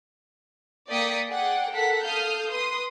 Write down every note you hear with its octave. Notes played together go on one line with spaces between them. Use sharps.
A#3 D5 G5 D#6 B6 C#7
G#4 D5 F#5 G5
A4 A#4 F#5 B6
A4 F5 D#6 F6 G6
B4 C6 D#6